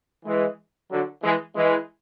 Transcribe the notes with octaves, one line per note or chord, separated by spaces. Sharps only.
E3 G#3
D3 F#3
E3 G#3
E3 G#3